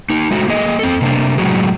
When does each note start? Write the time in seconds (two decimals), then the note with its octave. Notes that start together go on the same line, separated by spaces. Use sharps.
0.10 A#3 D#4
0.31 G#3 A3 F#4
0.48 A#3 G#4 D#5
0.79 C4 A4
1.02 C3 A#3 D4
1.38 A2 F#3 G#3 F#4 G#4